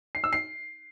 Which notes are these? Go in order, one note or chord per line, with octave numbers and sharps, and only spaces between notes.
C7
E6
C7